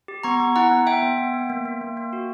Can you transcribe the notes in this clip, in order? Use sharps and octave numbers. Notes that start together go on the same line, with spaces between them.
G4
B3 A#5 C#6
B3
E4 F#5 A#5
B3
B3 E5 G5
B3
B3
B3
A#3
A#3
A#3
A#3
F#4